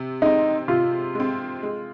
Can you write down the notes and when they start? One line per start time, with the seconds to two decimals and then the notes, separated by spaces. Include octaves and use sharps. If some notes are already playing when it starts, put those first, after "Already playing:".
Already playing: C3
0.22 G#3 C4 D#4
0.68 C3 F4
1.15 G#3 C4
1.63 G#3